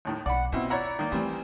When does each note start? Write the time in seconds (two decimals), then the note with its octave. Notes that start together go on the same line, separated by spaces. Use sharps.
0.05 D#2 A2 D#3
0.26 B1 D5 F#5 B5
0.52 B2 C4 E4 F4
0.70 E4 C#5 D5 F#5 A#5
0.99 D#3 A#3
1.12 E3 G3 A3 C4